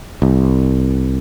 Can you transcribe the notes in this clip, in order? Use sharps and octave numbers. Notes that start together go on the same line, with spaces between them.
C2